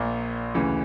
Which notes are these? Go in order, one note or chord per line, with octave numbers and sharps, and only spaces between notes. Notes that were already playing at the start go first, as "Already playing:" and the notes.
Already playing: A#1 A#2 A#3
D2 C#3 E3